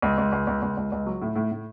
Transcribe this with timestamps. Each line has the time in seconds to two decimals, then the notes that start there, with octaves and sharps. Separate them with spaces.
0.02 C#2
0.18 C#2
0.32 C#2
0.47 C#2
0.62 C#2
0.77 C#2
0.92 C#2
1.06 F#3
1.21 A2
1.36 A2
1.51 A2